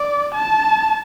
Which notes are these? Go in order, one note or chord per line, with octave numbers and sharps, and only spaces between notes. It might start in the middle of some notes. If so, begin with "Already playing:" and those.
Already playing: D5
A5